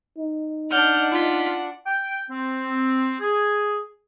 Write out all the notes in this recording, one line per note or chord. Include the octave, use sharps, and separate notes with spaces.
D#4
D4 F#5 F6 G6
F4 B6
G5
C4
G#4